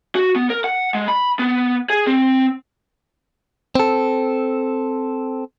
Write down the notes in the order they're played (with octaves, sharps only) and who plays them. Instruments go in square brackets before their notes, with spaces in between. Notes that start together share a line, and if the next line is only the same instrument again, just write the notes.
[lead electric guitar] F#4
B3
A#4
F#5
G#3
B5
B3
G#4
C4
[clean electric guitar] C4 A4